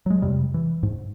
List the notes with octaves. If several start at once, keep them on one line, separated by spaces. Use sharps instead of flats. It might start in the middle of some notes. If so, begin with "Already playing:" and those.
F#3 G#3
F2 C3 G3
E3
G#2